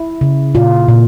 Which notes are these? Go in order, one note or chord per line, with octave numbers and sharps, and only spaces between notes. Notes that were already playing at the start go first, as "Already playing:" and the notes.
Already playing: E4
C#3
A#2 F4
A#2